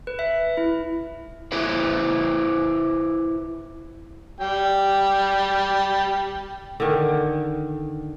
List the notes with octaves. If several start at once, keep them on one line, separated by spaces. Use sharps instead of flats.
B4
E5
E4
E4 G#4 B4 C5 E5
G3 G5
D3 D#3